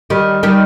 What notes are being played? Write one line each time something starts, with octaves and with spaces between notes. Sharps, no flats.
D#3 G3
D#3 G3